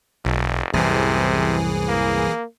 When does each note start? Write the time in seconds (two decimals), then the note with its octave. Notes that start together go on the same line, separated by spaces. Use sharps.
0.25 F1 B1
0.74 C2 F#2 A2 C3 E3 G#4
1.88 A#3